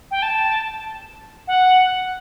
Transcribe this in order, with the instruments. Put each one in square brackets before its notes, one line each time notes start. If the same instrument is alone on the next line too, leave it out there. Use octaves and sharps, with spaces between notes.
[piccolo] G5
A5
F#5